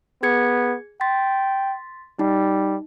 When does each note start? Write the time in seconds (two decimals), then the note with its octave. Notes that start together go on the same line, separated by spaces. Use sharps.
0.23 B3 G#4 G#6 C#7
1.01 G5 C6 A6 B6
2.19 G3 D#4